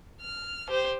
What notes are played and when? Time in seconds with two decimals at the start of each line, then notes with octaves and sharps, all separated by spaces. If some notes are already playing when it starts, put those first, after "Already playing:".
0.21 F6
0.69 G4 C5